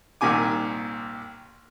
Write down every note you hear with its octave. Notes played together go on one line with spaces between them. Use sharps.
C2 A#2 D#3 G#5 D6